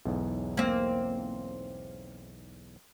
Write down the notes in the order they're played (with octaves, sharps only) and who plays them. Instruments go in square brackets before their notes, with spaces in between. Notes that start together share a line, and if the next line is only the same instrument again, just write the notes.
[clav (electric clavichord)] B1 E2 G#2
[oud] A#3 C4